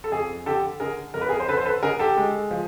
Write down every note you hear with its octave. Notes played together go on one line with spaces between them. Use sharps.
A4
F2 G#4
D3 G4 A4
D3 G#4 A#4
F2 A#4
B4
G#4 A#4
C5
D3 A4 B4
C5
A4 B4
D3 G#4 A#4
G4 A4
G#3
F3